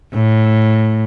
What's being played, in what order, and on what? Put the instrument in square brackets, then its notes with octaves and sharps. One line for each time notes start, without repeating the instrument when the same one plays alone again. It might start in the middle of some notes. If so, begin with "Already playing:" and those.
[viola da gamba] A2